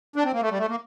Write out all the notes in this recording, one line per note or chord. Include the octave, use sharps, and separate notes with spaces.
D4
C4
A#3
A3
G3
A3
A#3